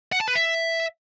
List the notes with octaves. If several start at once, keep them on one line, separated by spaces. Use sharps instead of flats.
F#5
A5
B4
E5